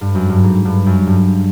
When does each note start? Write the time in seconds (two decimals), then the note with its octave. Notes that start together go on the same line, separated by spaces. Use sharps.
0.01 G2
0.15 F#2
0.29 G2
0.43 G#2
0.65 G2
0.86 F#2
1.07 G2